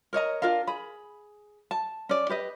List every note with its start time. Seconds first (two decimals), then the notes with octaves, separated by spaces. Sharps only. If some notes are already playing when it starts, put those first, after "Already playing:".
0.13 A#4 C#5 D#5 A#5
0.42 D4 F4 A#4 F5
0.67 G#4 B5
1.71 A5
2.09 C#4 D5
2.29 G4 B4 D#5